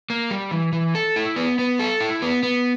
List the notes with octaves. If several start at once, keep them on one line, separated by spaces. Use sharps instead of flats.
A#3
G3
E3
E3
A4
E4
B3
B3
A4
E4
B3
B3